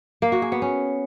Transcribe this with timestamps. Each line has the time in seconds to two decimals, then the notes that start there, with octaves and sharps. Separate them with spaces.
0.22 A#3
0.32 F#4
0.42 G#4
0.52 B3
0.62 C#4